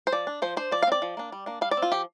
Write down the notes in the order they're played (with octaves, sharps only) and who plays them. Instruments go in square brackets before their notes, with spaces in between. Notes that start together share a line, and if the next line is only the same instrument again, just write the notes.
[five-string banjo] C5
F3 D5
D4
F3 C5
D4 C5
F3 D5
F5
C4 D5
F3
A#3 D4
G3
A#3 D4
G3 F5
D5
C4
F4
F3 G4